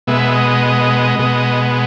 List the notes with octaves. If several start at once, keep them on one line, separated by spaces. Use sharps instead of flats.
B2 G#3 B3 E5
D#5
B2 G#3 B3